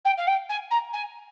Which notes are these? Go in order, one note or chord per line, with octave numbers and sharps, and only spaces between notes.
G5
F5
G5
G#5
A#5
G#5